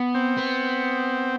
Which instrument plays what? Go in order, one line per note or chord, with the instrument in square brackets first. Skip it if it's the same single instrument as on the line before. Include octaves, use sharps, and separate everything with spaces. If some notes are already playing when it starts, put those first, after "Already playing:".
Already playing: [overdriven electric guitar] B3
[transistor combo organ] C4
[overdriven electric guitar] B3